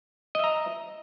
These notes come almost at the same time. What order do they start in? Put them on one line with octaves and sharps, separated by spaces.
D#5 E5 A#5